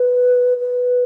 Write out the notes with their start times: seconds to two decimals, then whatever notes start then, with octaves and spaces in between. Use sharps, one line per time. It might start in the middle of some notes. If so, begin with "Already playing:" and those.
Already playing: B4
0.58 B4